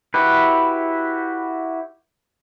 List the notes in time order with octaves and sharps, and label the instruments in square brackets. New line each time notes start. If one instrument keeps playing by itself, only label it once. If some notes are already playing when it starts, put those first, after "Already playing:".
[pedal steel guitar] E4 F#4 G4 B4